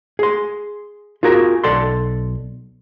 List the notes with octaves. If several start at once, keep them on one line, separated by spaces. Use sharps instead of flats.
G#4 C6
F4 F#4 G#4 A#4
B1 A4 D5 C6